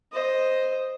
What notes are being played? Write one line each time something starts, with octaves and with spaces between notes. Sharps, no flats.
C5 D#5